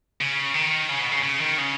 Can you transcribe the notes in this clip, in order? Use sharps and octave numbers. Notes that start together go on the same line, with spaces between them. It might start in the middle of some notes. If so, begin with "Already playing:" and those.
C#3
D#3
C#3
B2
C#3
C#3
D#3
C#3